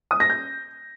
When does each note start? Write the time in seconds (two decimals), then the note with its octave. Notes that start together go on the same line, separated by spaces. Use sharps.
0.11 D#6
0.20 A#6
0.30 G6